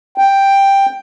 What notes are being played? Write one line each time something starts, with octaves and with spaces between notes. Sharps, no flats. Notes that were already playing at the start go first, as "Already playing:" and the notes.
G5